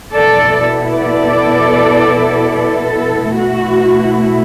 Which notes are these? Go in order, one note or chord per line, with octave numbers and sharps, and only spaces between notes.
B2 B3 E4 A4 D5
A4 D5
A4
B2 A3 E4 F#4